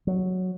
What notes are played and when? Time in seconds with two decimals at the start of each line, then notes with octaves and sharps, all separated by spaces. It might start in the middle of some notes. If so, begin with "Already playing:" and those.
0.07 F#3